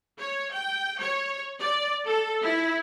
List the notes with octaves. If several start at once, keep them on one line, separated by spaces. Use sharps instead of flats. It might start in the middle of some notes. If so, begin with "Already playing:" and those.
C#5
G5
C#5
D5
A4
E4